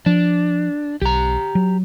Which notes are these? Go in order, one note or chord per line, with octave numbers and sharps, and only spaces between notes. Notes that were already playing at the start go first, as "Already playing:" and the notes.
F3 D4
B1 G4 A#5
F#3